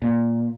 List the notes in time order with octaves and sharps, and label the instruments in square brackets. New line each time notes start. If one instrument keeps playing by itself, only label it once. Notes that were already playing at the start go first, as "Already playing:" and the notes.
[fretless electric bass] A#2